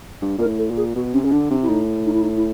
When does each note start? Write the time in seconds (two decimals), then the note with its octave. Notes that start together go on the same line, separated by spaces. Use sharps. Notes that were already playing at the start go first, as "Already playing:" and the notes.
0.22 G2
0.38 A#2 A#4
0.46 A2
0.58 A4
0.71 A#2
0.77 G#4
0.95 B2 F#4
1.13 C3 C#4
1.24 C#3 C#4
1.32 D3 D4
1.50 C3 D4
1.62 E4
1.69 A2 D#4
2.05 D#4
2.14 E4
2.22 D#4
2.37 E4